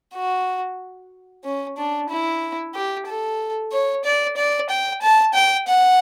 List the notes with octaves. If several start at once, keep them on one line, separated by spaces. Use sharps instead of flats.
F#4
C#4
D4
E4
G4
A4
C#5
D5
D5
G5
A5
G5
F#5